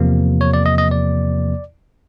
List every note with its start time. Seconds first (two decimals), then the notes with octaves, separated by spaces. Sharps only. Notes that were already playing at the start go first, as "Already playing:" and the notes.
Already playing: E2 C3 F3 A#3
0.41 C#5
0.54 D5
0.66 D#5
0.78 D#5
0.91 D5